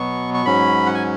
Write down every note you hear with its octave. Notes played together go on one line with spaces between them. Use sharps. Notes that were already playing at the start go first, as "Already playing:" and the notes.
Already playing: B2 F#3 B3 C#6
C#6
G#2 F#3 C#4 B5
F#5
G#5